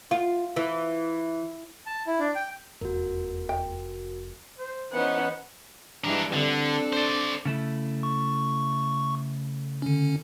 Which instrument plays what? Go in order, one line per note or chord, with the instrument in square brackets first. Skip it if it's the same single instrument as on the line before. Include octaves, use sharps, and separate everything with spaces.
[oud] F4
E3
[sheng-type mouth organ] A5
E4
D4
G5
[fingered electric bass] F1 [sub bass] E2 [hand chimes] F#4 A#4
[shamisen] G5
[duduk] C5
[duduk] E3 [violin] B3 C5 [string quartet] C#4 D#4 F#5
[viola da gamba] G2 E3 G#3 [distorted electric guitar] D4 A#4
[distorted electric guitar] D3 [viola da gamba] C4 D4 A4
[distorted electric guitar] C5 D5
[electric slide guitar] C#3 A3 E4
[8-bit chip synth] C#6
D3 C#4